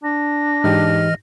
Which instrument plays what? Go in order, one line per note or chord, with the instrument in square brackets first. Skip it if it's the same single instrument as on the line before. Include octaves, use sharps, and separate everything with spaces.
[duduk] D4 [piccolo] A#6
[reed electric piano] G#2 D#4 G4 [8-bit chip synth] E3 D#5 F6